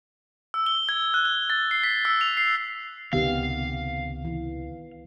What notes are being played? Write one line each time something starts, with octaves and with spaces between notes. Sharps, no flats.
E6
G7
G#6
F#6
G7
A6
C7
B6
E6
F7
C7
C#2 C3 D#3 B3 G4 F5
E3